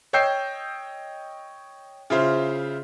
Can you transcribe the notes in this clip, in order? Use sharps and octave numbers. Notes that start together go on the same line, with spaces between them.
C#5 D#5 G5 E6 G6 C7
C#3 E4 F4 C5